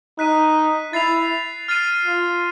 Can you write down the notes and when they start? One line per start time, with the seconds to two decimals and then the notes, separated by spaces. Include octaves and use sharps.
0.19 D#4 F#6 B6 D#7
0.93 E4 A6 C7 F7
1.68 F6 A6 C7 D#7
2.05 F4